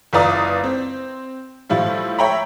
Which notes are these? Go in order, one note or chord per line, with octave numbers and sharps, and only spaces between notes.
F#1 F4 B4 D5 A#5 D#6
C4
A2 F3 G3 E4 F4
C#5 E5 G5 A#5 B5